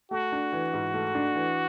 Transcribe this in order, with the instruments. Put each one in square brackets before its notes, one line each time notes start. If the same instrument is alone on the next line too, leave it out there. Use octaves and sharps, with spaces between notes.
[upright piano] A3 [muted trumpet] F#4
[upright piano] D4
E3
G#2
A3
D4
E3